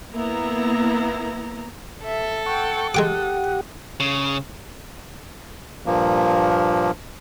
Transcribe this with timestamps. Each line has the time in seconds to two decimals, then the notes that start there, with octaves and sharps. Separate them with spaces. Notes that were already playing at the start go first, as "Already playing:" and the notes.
0.12 A#3 B3 E4 A#5
2.05 A4 E5
2.46 F#5 G5 C#6
2.95 G#3 G4 F#5 G5 D6 D#6
4.00 C#3
5.86 G2 A#2 F3 A#3